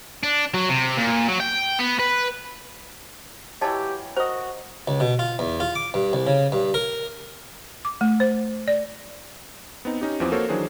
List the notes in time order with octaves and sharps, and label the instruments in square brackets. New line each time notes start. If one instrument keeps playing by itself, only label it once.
[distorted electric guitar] D4
F#3
C3
A#2
F#3
G5
B3
B4
[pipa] E3 F#3 C#5 [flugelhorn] G4 [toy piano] D#5 A5
[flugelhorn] F#4 [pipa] A#4 D#5 [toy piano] C5
[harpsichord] C#2
B2
F4
E2
F4
D6
G2
C2
C#3
G2
A#4
[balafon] D6
A3
C5
D5
[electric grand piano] B3 C4 D#4
C#4 D#4 G4
E2 E3 F3 C4 D6 D#6
A#3 F#4 A4 A#4 C5 C#5
D#3 E3 F#3 D4 G#4 C5